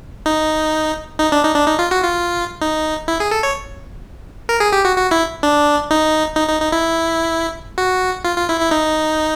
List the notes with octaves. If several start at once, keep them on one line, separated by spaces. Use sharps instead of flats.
D#4
D#4
D4
D#4
D4
D#4
F4
F#4
F4
D#4
E4
G#4
A4
C#5
A#4
G#4
G4
F#4
F#4
E4
D4
D#4
D#4
D#4
D#4
E4
F#4
F4
F4
E4
E4
D#4